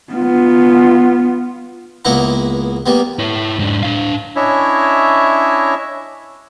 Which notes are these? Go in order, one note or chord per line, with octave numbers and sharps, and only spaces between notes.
B3 F4
C#2 A#3 B3 E4 F#5 A#5
G3 A#3 B3
E4 C#5
G#2 D4
D4 F5
C#4 D4 E4 C#5 D#5 E5